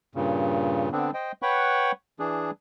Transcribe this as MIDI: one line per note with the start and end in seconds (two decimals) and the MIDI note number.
0.15 0.89 43
0.15 0.89 46
0.15 0.89 49
0.92 1.11 50
0.92 1.11 59
0.92 1.11 60
0.92 1.11 62
1.14 1.32 72
1.14 1.32 75
1.14 1.32 79
1.42 1.92 71
1.42 1.92 73
1.42 1.92 78
1.42 1.92 79
1.42 1.92 83
1.42 1.92 85
2.20 2.51 52
2.20 2.51 62
2.20 2.51 68